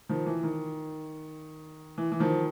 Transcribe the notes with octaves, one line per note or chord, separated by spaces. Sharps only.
D#3 F3
E3
D#3
E3
E3
D#3 F3